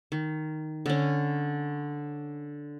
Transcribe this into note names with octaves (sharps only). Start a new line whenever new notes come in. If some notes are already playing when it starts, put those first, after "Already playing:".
D#3
D3 C#4